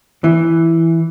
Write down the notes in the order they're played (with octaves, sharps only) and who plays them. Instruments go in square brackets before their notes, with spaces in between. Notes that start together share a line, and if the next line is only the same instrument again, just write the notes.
[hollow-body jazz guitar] E3